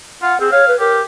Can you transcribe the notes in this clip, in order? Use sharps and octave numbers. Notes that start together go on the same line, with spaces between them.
F4 F#5
C4 G#4
C#5 F5
B4
G4 A#4